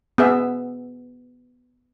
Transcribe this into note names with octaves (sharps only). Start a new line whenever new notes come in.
B3 G#4 E5